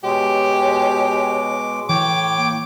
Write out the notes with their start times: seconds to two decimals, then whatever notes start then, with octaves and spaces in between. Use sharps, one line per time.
0.04 B2 G#3 G4 C#5 D6
1.89 A2 E3 C#5 G5 D6
2.36 A#3